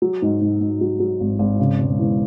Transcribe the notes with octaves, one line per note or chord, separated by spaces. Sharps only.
F#3
G#2
G#2
G#2
F#3
F#3
G#1
G#1
C#3
E1
E2